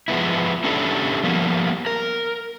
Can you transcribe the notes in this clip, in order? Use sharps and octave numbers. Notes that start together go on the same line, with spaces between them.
F3 G#3 B3 E4
C#4 D4 E4 G4 A4
F3 G3 A#3 B3
A#4